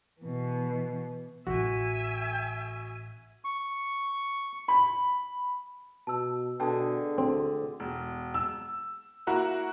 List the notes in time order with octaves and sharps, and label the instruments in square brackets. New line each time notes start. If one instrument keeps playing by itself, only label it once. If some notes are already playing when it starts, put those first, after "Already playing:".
[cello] B2 E3
[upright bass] A1 [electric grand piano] F#4 [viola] E5 G#5
[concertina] C#6
[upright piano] B5
[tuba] B2 [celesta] A5 E6
[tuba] B2 [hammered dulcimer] D3 G#4 [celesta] G5 A5
[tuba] D2 [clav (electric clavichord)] C4
[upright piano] E1
E6
A#3 E4 F#4 F#5 A#5